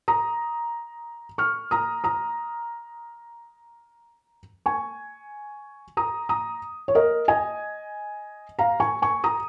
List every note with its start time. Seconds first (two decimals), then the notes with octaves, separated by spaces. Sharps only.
0.08 A#5 D#6
1.38 C#6 F6
1.71 A#5 D#6
2.04 A#5 D#6
4.66 G#5 C#6
5.97 A#5 D#6
6.29 A#5 D#6
6.88 C#5
6.95 A#4 D#5
7.28 D#5 G#5
8.59 F5 A#5
8.80 G#5 C#6
9.02 G#5 C#6
9.24 A#5 D#6